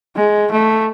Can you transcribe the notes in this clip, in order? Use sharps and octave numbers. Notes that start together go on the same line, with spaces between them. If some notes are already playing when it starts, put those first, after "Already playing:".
G#3
A3